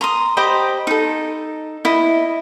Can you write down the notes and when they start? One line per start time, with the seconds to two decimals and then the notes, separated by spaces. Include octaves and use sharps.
0.01 A#5 C6 D#6
0.37 G4 C5 D#5 B5
0.87 D#4 A4
1.85 E4 D#5